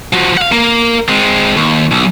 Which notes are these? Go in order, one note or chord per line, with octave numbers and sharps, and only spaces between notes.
F3 F#4
F5 F#5
A#3
G#3 C4
D#2
B1